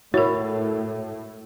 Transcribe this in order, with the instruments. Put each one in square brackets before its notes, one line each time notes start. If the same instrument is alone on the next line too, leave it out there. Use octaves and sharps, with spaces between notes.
[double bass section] A2 [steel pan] E4 F#4 [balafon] A#4 C#5